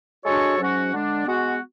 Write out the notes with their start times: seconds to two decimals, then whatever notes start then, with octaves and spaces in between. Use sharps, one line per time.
0.23 G#3 D4 F#4 A4 C#5
0.58 G#2 F#3 C#4 F#4
0.92 D3 G#3 D4
1.25 G#3 B3 F#4